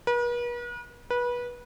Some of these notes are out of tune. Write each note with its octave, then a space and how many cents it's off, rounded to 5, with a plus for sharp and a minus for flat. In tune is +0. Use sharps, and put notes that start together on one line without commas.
B4 -45
B4 -25